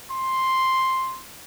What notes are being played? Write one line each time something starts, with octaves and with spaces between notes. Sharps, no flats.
C6